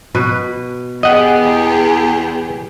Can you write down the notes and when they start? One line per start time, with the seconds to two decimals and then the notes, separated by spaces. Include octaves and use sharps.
0.15 B2 B4
1.03 B3 G4 G#4 D#5 F#5
1.37 E2